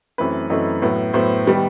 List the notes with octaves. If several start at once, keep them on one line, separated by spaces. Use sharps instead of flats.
F#2 E3 A3 C4 B4
F#2 E3 A3 C4 D#5
A2 F#3 B3
A2 F#3 B3 C5
D#3 G3 B3